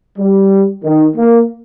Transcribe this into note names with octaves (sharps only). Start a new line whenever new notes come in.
G3
D#3
A#3